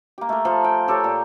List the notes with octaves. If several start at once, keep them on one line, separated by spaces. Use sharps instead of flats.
A#3 G4
A3 A#4
F3 A4 F5
G5
G4 A4 A#4 C#5
A#2